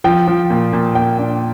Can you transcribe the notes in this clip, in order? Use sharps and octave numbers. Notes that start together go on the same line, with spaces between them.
F3 G5
F3
A#2
A#2
A#2 G5
D4